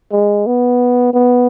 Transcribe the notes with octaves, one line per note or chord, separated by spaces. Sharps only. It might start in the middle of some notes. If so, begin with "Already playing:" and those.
G#3
B3
B3